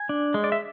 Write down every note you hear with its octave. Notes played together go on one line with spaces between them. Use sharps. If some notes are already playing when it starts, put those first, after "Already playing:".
Already playing: G#5
D4
G#3
D5
E5